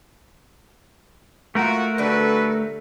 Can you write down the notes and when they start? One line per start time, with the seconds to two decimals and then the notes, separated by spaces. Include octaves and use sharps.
1.55 A3 F4 F#4 A#4
1.98 D3 G3 D4 F#4 A4 B4